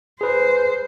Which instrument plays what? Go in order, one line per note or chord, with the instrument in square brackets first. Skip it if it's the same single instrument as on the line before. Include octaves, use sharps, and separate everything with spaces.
[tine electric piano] G#4 B4 [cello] C5